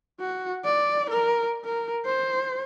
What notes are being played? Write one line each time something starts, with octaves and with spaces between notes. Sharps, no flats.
F#4
D5
A#4
A#4
C5